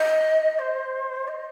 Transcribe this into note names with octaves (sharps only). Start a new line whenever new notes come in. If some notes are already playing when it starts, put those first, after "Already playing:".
Already playing: D#5
C5
D#5